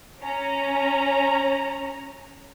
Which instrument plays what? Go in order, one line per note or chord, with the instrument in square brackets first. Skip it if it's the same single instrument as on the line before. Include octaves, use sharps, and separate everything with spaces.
[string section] C#4 A#5